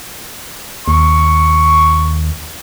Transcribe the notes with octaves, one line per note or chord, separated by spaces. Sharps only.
D#2 C#6